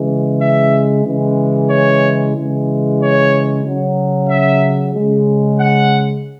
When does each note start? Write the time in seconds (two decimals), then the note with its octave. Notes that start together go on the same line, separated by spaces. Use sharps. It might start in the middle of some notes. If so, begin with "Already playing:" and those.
Already playing: C#3 E3 G#3
0.40 E5
1.04 C#3 E3 G#3
1.69 C#5
2.35 C#3 E3 G#3
3.00 C#5
3.64 C#3 F#3
4.29 E5
4.95 C#3 G#3
5.60 F#5